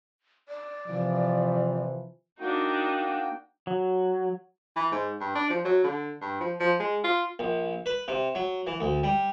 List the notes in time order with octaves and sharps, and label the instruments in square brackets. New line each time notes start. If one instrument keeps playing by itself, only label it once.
[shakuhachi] D5
[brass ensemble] C3 E3 F3
[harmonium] A#3 F#4 G5 [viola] D4 D#4
[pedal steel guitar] F#3
[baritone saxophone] E3
G#2
G2
D4
F3
F#3
D3
G2
F3
F3
G#3
F4
[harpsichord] A#1
B4
C3
F#3
E3
D2
G3